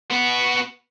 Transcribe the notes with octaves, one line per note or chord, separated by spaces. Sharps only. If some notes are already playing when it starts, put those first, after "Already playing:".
B3 F#4